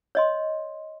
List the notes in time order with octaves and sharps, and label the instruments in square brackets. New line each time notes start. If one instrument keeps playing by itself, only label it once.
[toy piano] C#5 D#5 C6